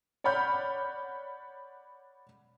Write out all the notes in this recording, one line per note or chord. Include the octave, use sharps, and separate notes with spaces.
C#5 D5 F#5 B5 F6 G6